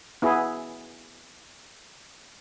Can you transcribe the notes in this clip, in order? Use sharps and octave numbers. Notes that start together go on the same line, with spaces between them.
B3 E4 G#4